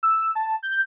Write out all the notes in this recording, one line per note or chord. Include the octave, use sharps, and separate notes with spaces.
E6
A5
G6